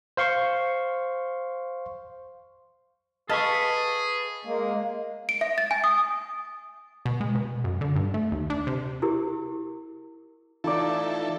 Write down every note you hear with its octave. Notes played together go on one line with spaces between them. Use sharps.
C5 F5 C6 C#6
G#4 A4 B4 D#5 F5 A5 C#6
G#3 A#3
D7
E5
A6
G#5
D#6
B2
G#3
B2
F#2
D3
G2
A3
D#2
D4
C3
E4 G4 G#4 A#4
E3 D#4 F4 A4 D5